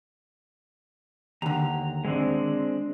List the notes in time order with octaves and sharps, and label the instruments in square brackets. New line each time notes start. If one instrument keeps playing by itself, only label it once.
[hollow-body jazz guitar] D#2 D3 [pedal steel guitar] A#5
[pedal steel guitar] G#3 C4 D4